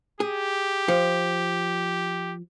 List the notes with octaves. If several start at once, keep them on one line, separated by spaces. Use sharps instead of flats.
G4 G#4
F3